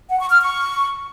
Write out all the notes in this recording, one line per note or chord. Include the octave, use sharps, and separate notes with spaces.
F#5
C#6
F6
C#6